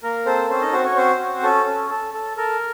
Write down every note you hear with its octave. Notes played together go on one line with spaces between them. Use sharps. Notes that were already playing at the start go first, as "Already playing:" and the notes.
A#3 A#4
C4 A4 C5
C4 C#4 C5
D#4 D#5
C4 F#4 C5
C#4 C#5
C4 C#4 C5
F#4
C#4 A4
C#4
A4
A4
A4 A#4